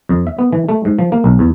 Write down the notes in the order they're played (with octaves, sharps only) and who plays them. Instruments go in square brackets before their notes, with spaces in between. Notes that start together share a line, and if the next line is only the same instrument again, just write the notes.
[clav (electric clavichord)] F2
E5
B3
E3
A3
G#2
F3
A#3
B1
E2